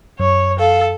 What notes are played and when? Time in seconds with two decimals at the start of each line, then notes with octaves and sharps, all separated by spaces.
0.20 F#2 C#5
0.59 A4 F5